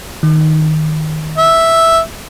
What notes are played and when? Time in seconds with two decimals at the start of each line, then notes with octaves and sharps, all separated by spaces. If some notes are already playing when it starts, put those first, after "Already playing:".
0.23 D#3
1.38 E5